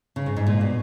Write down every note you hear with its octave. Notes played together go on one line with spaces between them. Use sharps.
C#3
G#2
G#2
A#2
B2